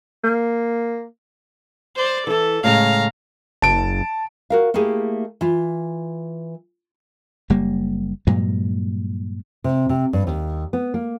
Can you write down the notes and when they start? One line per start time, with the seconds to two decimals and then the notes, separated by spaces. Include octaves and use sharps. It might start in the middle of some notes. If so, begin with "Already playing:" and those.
0.24 A#3
1.96 C5 D5
2.27 E3 E4 A4
2.64 A2 C#3 G#3 F5 A#5
3.62 F#1 A5 D7
4.50 F#4 A#4 F5
4.74 A3 A#3 E4 G4 G#4
5.41 E3 F4
7.50 F#1 G3 A#3
8.27 G2 A#2 F#3 G#3
9.64 C3
9.89 C3
10.13 G2
10.27 D#2
10.73 B3
10.94 A#3